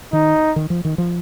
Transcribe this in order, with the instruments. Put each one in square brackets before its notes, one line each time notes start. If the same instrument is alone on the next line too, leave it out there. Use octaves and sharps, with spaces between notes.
[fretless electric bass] D#3 [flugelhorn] D#4
[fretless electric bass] D#3
F3
D#3
F3